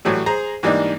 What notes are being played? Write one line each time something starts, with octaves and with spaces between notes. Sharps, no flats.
A2 E3 F#3 G3 A3
G#4 C5 A#5
G#2 E3 G3 A#3 D4 D#4